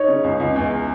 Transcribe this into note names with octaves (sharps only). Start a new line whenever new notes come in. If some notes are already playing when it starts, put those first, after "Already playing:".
Already playing: D#4 C#5
C#3
C#2
C#2
E2